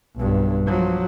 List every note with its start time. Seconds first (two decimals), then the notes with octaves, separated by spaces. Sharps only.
0.17 B1 G2
0.67 F3 F#3